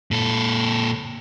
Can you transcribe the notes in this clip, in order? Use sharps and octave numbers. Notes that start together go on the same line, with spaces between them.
A#2 A4